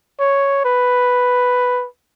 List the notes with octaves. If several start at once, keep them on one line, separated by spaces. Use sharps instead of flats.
C#5
B4